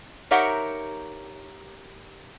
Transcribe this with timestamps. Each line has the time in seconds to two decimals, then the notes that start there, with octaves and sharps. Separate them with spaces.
0.31 D#4 G4 A#4 C#5 E5 F#5